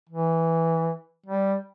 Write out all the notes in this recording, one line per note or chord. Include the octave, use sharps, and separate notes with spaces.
E3
G3